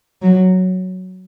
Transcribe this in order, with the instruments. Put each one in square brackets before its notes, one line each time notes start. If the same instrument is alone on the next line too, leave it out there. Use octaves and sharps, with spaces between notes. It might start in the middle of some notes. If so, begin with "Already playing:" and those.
[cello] F#3